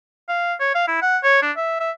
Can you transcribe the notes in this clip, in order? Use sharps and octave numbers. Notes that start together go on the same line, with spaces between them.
F5
C#5
F5
E4
F#5
C#5
D4
E5
E5